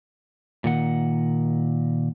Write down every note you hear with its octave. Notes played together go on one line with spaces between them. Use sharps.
A#2 D#3 F#5